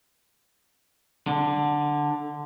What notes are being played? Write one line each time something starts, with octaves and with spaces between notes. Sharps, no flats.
D3